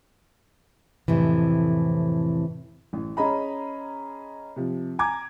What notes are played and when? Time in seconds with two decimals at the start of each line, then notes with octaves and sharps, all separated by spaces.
1.08 F2 A2 C3 E3
2.93 A1
3.17 C#4 G#4 D#5 A#5 B5
4.56 C3 F3
4.99 G#5 A#5 D6 G#6